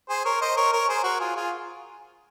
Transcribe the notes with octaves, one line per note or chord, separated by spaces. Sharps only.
G#4 C5
A#4 C#5
C5 D#5
A#4 C#5
A#4 C#5
G#4 C5
F#4 A#4
F4 G#4
F4 G#4